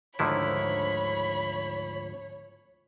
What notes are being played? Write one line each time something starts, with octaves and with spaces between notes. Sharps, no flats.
D2 G#2 D3 D#3 F3 E4 C#5 B5